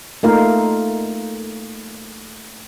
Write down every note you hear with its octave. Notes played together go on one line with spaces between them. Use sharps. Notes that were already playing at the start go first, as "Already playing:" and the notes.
A3 A#3 D#4 F4 A#4 F5